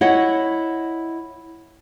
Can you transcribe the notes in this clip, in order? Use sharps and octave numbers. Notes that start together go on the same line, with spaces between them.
E4 C#5 D#5 F#5